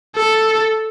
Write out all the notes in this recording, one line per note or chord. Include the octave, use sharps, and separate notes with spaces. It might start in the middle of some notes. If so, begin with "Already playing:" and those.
A4